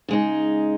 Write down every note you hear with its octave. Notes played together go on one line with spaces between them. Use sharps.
C#3 G#3 D#4